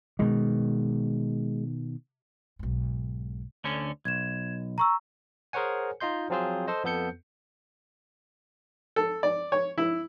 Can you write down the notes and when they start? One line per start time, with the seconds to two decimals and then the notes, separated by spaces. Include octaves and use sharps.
0.19 B2 D#3 G#3
2.59 B1 G#2
3.64 D2 D3 C#4
4.05 B1 G#6 E7
4.78 A#5 C#6 E6
5.53 G#4 A#4 C5 C#5 F#5 G#5
6.00 D#4 F4 D#5 C6 G6
6.30 F3 F#3 C4 F4 G#4 C5
6.67 A4 C5 D#5
6.84 F2 B3 A4 G6 C#7
8.96 A4
9.23 D5
9.52 C#5
9.78 E4